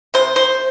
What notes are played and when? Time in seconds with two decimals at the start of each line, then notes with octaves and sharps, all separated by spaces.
0.14 C3 C5
0.36 C5